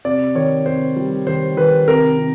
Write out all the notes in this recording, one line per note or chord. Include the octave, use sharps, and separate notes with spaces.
C3 D5
D#3 C#5
C3 C5
G3
D#3 C5
D#3 B4
C3 A#4
C3